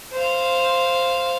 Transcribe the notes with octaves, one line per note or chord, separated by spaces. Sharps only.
C5 F5